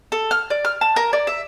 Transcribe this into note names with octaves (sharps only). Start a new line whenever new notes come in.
A4
F6
D5
F6
A5
A#4
D5
E5